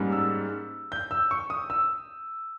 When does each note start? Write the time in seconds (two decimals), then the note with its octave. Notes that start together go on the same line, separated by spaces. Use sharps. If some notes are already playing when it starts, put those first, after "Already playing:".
Already playing: G#2 G3 A#3 C#4
0.12 E6
0.92 G6
1.11 E6
1.31 C#6
1.50 D#6
1.70 E6